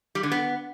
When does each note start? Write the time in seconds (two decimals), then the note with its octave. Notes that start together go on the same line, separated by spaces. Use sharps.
0.15 G3
0.23 D3
0.32 B3